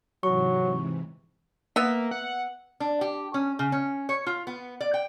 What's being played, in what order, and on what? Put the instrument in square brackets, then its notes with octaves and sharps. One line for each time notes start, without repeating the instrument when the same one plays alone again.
[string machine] G#2 C3 E3 [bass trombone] F#3 [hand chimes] C#6
[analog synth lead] A#3 [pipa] B3 E5
[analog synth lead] F#5
[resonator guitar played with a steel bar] D4
G4
C#4
C#3
C#4
C#5
F4
B3
D5
G5